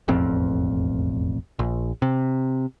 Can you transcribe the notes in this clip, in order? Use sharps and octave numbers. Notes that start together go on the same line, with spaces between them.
E1 A1 F2 C4
A#1
C3